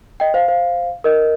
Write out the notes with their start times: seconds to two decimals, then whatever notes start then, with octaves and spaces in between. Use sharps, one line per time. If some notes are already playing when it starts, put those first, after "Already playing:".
0.20 D#5 G5
0.34 C5 F5
0.48 C5 F5
1.04 A#4 D#5